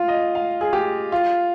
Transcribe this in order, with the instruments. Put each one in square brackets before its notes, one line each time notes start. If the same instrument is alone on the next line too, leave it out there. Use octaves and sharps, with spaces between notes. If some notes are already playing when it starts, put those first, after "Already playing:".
Already playing: [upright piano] F4
D#5
F5
G#4
G4
F4